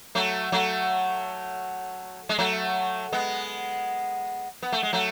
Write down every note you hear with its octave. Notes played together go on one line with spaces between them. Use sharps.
F#3 A3
F#3 A3
G#3
F#3 A3
G#3 B3
B3
A3
G#3
F#3 A3